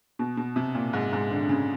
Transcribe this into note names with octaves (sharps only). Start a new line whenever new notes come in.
B2
B2
C3
A#2
G#2
G#2
D3
D3
C#3